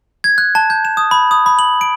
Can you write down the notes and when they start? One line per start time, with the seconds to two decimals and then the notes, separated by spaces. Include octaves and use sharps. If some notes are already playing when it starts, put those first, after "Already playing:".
0.24 G#6
0.38 F#6
0.55 A5
0.70 G6
0.85 E7
0.97 D#6
1.11 B5
1.31 D#6
1.46 B5
1.59 F#7
1.81 D7